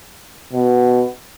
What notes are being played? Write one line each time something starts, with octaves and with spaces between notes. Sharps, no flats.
B2